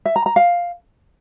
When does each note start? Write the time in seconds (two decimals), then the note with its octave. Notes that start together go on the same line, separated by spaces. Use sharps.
0.06 E5
0.16 A#5
0.26 A#5
0.36 F5